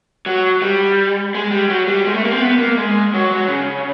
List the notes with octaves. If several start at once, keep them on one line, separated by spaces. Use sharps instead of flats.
F#3
G3
G#3
G3
F#3
G3
G#3
A3
A#3
C4
B3
A#3
G#3
F#3
F#3
C#3